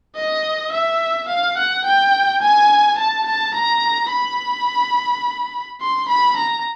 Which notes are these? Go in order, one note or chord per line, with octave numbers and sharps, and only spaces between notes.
D#5
E5
F5
F#5
G5
G#5
A5
A5
A#5
B5
C6
B5
A#5